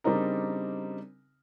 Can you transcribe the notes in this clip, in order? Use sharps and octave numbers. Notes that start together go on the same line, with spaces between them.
C#3 G3 C4 D4 D#4 A#4